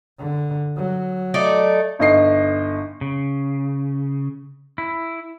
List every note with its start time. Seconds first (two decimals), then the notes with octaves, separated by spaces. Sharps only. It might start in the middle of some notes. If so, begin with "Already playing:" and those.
0.19 D3
0.76 F#3
1.34 A3 D#4 D5
1.99 G1 D#4 D#5 C7
3.01 C#3
4.78 E4